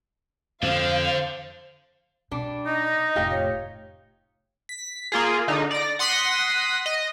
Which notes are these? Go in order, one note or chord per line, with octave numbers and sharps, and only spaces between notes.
F2 D3 C5 F5
B2 G3 D4
D#4 D#5
F1 A2 F4 G4 F5
C#5
B6
A#3 F4 G#4
D3 D#4
D5 A#6
F#5 C6 D#6 A#6 B6
D#5